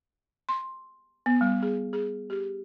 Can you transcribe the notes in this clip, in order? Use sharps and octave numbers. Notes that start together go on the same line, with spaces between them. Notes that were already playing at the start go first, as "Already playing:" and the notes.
C6
B3
G3
G#4
G#4
G4